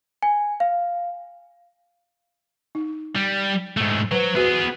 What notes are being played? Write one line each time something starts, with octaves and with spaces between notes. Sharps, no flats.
G#5
F5
D#4
G3
G#2 A3
F#3 B4 C5
B3 F#4 G#4 B4